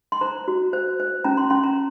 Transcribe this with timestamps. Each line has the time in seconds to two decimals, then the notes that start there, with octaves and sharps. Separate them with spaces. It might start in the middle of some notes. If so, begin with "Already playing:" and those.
0.12 C6
0.21 C5 A#5
0.48 F#4
0.73 C5
1.00 C5
1.25 C#4 A#5
1.37 C6
1.50 C#4 C6
1.64 A#5